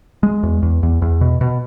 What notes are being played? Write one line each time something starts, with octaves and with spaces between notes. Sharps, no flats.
G#3
E2
E2
E2
E2
B2
B2